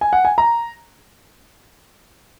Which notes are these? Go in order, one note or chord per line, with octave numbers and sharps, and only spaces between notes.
G#5
F#5
G#5
A#5